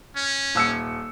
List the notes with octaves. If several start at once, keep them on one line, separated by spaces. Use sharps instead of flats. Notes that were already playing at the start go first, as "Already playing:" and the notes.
C#4
D#1 E6 C#7